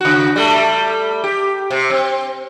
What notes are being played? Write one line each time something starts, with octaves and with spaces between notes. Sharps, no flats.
C#3 F#4
G3 A3
G4
C3
C4